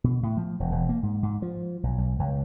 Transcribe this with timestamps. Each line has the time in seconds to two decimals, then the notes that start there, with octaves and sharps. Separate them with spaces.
0.04 B2
0.23 A2
0.37 F3
0.60 E1
0.72 E1
0.89 A#3
1.03 G#2
1.23 G#2
1.42 F3
1.83 B1
1.98 B1
2.19 C#2